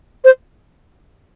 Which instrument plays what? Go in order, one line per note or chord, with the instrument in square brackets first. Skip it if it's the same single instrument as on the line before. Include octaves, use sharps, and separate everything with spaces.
[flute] C5